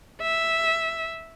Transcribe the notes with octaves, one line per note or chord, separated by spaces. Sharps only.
E5